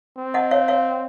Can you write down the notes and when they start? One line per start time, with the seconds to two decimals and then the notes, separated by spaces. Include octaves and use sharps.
0.17 C4
0.34 D#5 F#5
0.51 C#5 F5
0.68 C#5 F5